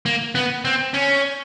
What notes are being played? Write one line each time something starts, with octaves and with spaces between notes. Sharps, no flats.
A#3
B3
C4
C#4